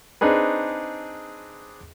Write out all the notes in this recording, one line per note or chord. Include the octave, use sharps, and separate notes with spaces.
C4 D4 D#4 G#4 B4